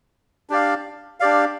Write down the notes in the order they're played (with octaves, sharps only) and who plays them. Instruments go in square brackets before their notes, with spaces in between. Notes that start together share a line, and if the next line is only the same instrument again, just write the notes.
[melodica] D4 G4 D5 F5
D4 G4 D5 F5